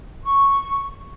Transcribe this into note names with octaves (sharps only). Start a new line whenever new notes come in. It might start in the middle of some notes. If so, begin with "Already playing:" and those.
C#6